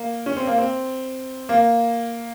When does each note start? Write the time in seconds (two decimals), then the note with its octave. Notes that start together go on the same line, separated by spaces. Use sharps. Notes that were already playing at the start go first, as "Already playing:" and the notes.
Already playing: A#3
0.26 C#4
0.37 C4
0.47 A#3
0.58 C4
1.49 A#3